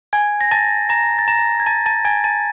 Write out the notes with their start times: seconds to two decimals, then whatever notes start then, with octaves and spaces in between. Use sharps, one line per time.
0.13 G#5 G#6
0.41 A#6
0.51 A5 A6
0.89 A#5 A#6
1.19 A6
1.28 A#5 A#6
1.60 G#6
1.66 A5 A6
1.86 A5 A6
2.05 G#5 G#6
2.24 A5 A6